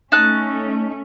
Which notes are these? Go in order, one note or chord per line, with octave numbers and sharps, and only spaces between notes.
A3 C#4 D#4 A5 F#6